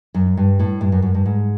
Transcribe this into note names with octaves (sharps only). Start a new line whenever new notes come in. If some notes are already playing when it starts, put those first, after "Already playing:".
F#2
G2
A2
G2
F#2
F#2
G2
G#2